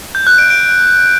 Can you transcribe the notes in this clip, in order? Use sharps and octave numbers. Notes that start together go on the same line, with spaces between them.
G6
F#6
D7
D7